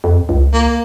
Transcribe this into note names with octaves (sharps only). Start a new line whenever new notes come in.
F2
C#2
A#3